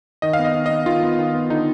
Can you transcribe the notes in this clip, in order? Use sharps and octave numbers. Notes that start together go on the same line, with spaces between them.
D#3 D#5
F5
B3
D#5
D#3
B3 D#5
D#3 F4
B3
D#3
B3
D3 D#4